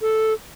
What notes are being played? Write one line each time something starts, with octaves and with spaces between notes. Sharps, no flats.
A4